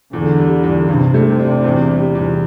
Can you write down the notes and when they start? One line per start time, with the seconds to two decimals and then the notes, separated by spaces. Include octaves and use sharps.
0.13 E2 D3
0.38 G3
0.64 E2
0.88 G2 C3
1.14 A3
1.39 D4
1.64 E2
1.89 G3
2.15 E2